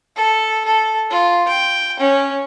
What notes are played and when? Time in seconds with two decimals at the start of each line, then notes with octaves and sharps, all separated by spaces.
0.16 A4
0.65 A4
1.10 F4
1.48 G5
1.99 C#4